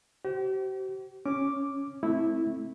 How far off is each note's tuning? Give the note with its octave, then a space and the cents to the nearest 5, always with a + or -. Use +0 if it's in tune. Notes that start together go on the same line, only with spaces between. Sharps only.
G4 -45 C5 +0
C#4 +0 D6 +0
A3 +0 C4 +5 E4 -10